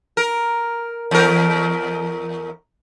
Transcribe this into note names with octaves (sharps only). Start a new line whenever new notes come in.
A#4
E2 A#4